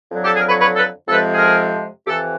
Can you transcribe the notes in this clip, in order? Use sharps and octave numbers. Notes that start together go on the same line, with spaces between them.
F2 D3 F#3
G4 A4
G#4 A#4
B4 C#5
B4 C#5
A4 B4
F2 C3 F3 G#3 A4 B4
G#4 A#4
F2 C3 E3 G4 A4